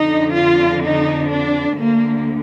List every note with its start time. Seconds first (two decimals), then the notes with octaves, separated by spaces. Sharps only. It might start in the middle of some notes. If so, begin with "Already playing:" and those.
Already playing: F2 D3 D#4
0.35 F4
0.83 D#4
1.31 D4
1.79 D2 D3 A#3